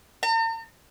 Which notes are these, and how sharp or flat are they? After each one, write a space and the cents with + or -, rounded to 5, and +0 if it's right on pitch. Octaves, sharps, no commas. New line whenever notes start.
A#5 -45